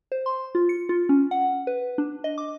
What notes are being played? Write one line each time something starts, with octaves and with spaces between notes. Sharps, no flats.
C5
C6
F4
C#7
F4
C#4
F#5
B4
D4
D#5
D6